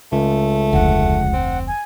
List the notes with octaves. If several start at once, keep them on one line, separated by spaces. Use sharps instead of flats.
C#2 A3
F1 D2 F#5
C4
G#5